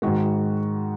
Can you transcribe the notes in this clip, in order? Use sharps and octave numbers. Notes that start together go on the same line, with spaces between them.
G#2 D#3 G#3 F#4